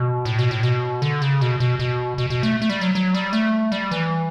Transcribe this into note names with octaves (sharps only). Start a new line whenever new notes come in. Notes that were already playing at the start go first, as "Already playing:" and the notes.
Already playing: B2
A2
B2
A2
B2
D3
C#3
B2
B2
B2
B2
B2
A3
A3
G3
F#3
F#3
G3
A3
G3
E3